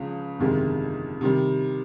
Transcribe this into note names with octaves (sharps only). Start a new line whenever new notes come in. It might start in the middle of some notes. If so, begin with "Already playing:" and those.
Already playing: C#2 C#3 F3
G1 F2 C3 D#3 G#3
C3 D#3 G3